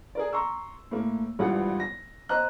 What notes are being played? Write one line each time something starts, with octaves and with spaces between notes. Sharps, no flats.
G#4 A#4 D5
A#5 C6 C#6 E6
A2 A#3
G#1 G2 E3 F4 F#5
A#6
C5 D#5 A#5 F#6